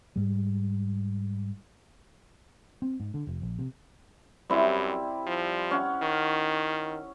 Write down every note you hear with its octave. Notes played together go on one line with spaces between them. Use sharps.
G#2 G3
C4
G#2
D3
F1
A#1
C3
F#2 G3 C4 E4
F3
C#4 F#5
D#3